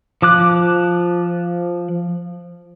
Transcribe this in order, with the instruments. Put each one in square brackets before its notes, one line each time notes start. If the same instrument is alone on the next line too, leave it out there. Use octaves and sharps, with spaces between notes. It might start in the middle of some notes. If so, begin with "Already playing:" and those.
[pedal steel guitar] F3 D6 F#6